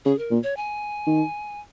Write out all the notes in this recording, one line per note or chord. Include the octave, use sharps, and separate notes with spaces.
C#3 G#4
A#4
A#2
C#5
G#5
D#3